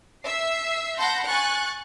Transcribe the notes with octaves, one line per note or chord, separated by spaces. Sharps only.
E5 E6 C7
F#5 A5 B5 C6 G6 A#6
G#5 C#6 F#6 A6